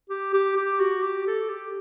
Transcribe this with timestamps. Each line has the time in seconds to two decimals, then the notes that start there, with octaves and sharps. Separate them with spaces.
0.10 G4
0.34 G4
0.57 G4
0.80 F#4
1.03 G4
1.27 A4
1.49 G4